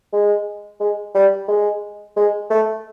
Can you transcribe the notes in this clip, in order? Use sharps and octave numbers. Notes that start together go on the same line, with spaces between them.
G#3
G#3
G3
G#3
G#3
A3